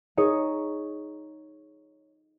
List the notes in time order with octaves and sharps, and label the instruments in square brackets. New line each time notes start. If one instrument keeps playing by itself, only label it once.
[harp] D#4 G#4 C#5